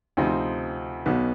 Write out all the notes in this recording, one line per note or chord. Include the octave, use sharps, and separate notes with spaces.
D2 C3 F3 C4 D#4
B1 B2 B3